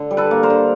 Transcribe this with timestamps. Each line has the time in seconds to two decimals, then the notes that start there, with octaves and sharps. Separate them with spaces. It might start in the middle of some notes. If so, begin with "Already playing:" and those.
Already playing: D3
0.11 G3
0.17 A4 B4
0.31 A#3
0.43 A#4 C5
0.50 D3